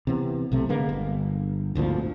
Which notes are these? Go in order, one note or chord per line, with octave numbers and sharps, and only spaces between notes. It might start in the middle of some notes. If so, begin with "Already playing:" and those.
C3 E3 B3
B1 C3 A3
D3 G#3 A#3 B3
G1
G#1 D2 A#2 F3